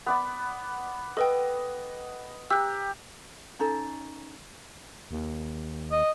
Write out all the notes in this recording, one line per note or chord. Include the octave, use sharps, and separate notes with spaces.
B3 D5 B5
A4 B4 D#5 G5
G4 A#5 E6 F#6
C#4 D#4 A4
D#2
D#5